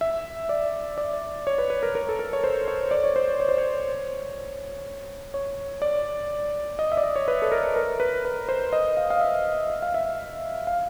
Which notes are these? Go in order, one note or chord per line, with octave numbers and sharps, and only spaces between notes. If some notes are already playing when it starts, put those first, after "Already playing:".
E5
D5
D5
C#5
B4
B4
A#4
A#4
A4
A#4
C#5
C5
C#5
D5
C#5
C5
C#5
C#5
C5
C#5
C#5
D5
D#5
E5
D5
D#5
C#5
B4
A4
A#4
A#4
B4
B4
C5
D#5
F5
F5
E5
E5
F5
E5
F5